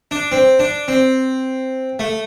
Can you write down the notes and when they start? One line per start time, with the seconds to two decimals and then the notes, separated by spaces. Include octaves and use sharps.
0.11 D4
0.32 C4
0.59 D4
0.88 C4
1.99 A3